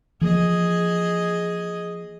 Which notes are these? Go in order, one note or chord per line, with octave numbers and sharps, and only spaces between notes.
E3 F3 A#3 G#4 D#5